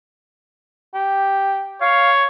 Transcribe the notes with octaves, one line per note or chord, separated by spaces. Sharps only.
G4
C#5 F5